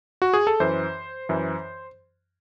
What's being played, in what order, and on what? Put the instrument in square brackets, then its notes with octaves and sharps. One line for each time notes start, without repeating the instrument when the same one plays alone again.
[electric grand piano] F#4
G#4
A4
F#2 E3 C5
F#2 E3